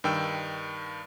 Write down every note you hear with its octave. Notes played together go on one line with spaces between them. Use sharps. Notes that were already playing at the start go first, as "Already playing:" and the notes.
G2 D#3 G5 E6